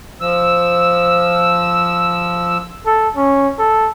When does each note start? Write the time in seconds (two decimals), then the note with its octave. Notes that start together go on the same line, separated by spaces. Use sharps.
0.21 F3 E6
2.86 A4
3.17 C#4
3.59 A4